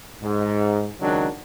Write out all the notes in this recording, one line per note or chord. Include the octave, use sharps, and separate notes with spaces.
G#2
C#2 D#3 F#3 D4